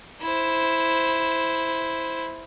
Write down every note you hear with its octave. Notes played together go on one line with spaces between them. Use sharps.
E4 C5